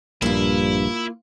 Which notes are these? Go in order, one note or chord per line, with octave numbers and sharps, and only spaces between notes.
A#1 G2 A#3 E4 F4